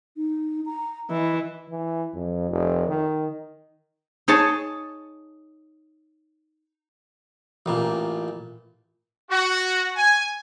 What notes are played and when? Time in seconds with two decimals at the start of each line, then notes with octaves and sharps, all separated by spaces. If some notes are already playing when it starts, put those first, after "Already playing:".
0.17 D#4
0.66 A#5
1.10 E3 D#5
1.69 E3
2.14 F2
2.50 F1
2.88 D#3
4.28 D#4 G#4 C#5 A5
7.66 A1 A#2
9.31 F#4
9.96 G#5